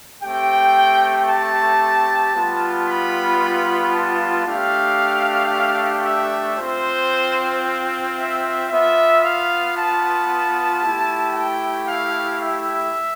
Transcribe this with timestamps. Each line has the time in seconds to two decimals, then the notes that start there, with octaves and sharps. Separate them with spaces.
0.23 A3 C4 G4 G5
1.28 A5
2.34 G3 B3 F4
2.87 B5
3.94 A5
4.46 A3 D4 G4 F5
6.05 E5
6.58 C4 F4 C5
8.17 E5
8.70 B3 F4 E5
9.24 F5
9.77 A5
10.83 A3 E4 G4
11.34 G5
11.87 F5
12.41 E5